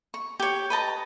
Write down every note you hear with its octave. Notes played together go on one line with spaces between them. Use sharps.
C#6
G4 C#5
B4 D#5 A5 A#5